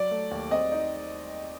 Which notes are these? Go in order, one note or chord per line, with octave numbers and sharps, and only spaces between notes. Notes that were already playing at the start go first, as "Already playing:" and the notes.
Already playing: F#3 D5
A3
D#2
C4 D#5
D#4